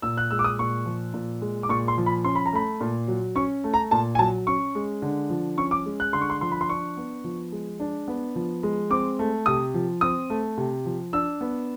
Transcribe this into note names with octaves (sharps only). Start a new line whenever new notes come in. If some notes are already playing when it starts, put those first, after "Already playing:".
A#2 E6
F#6
G#3 E6
D6
D#6
A#2 C#6
F3
A#2
G#3
D6
A#2 C#6
C6
F3
B5
C#4 C6
B5
A#5
A3 B5
A#2
F#3
C#4 C#6
A3
A#5
A#2 A5
G#5
F#3 A5
C#4 C#6
G#3
D3
F3
C#4 C#6
D6
G#3
F#6
D3 C6
C#6
C6
F3 C6
B5
C6
D4 C#6
B3
F3
G#3
D4
B3
F3
G#3
C4 D6
A3
C3 D#6
F3
C4 D#6
A3
C3
F3
D4 E6
B3